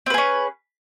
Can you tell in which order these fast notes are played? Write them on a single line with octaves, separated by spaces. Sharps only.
C4 B4 G#4 C#4